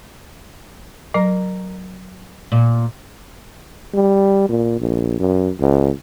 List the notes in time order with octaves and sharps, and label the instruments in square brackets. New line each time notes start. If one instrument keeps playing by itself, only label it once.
[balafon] F#3 [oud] A#4
[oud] A#2
[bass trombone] G3
A#2
A#1
F#2
C#2